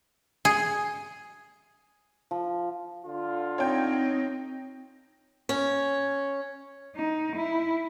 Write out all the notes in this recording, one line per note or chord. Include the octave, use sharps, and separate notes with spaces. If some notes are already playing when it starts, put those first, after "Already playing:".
G#4
F3
D3 F4
C4 D#4 C#5 G5
C#4
D#4
E4